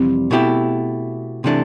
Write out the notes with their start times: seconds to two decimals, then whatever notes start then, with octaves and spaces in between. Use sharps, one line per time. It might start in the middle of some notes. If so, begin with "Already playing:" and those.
Already playing: F2 C3 E3 G3 C4
0.31 B2 A3 E4 G4
1.44 C3 E3 A3 D4